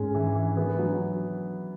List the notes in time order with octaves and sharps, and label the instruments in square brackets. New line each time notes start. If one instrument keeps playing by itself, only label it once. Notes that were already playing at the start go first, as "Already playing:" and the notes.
Already playing: [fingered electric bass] G#2 [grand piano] G#3 C#4
[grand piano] E3
E3
B3
F#3